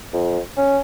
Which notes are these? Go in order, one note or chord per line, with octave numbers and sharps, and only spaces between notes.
F2
C#4